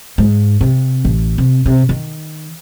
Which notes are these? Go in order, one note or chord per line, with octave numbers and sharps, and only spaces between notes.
G#2
C3
A1
C3
C3
D#3